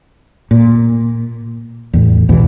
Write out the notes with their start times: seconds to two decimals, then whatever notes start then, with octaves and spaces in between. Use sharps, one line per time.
0.51 A#2
1.93 E2 A2
2.29 B1 E2 B2 E3